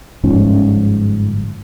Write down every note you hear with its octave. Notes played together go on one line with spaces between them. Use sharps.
G1 G#2 F3 C#4